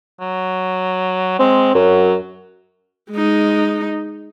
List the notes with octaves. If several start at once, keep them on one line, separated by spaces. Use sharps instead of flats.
F#3
G#3 C4
F#2 F#3
G#3 D#4